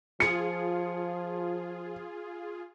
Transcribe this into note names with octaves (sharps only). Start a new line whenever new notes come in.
F3 F4 G#4 C#7